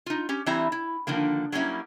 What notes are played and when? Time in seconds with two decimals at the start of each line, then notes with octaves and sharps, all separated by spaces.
0.06 D#4 F4
0.29 C#4 G4
0.46 E3 G3 C4 E4 E5 A#5
0.72 E4
1.07 D3 D#3 F3 A#3
1.52 F#3 G3 A#3 C#4 E4